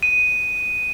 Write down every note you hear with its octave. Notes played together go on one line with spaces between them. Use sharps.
D#7